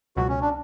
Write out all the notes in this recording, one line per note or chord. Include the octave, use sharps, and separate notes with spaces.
C#2 B2 F#3 F#4
C#4
D4